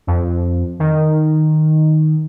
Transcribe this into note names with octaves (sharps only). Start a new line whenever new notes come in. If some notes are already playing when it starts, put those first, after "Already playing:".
F2
D#3